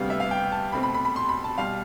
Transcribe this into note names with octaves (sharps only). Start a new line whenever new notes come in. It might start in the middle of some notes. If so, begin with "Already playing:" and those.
Already playing: D2 C3 G3 B3 F5
E5
F5
G5
A5
B2 A3 C4 B5
B5
B5
B5
C6
B5
A5
B2 G3 F5